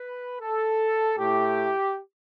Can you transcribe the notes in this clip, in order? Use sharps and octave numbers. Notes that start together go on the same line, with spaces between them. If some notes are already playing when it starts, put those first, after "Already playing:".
Already playing: B4
A4
A2 A3 E4 G4